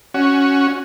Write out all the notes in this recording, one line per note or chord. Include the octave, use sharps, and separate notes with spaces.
C#4 F#4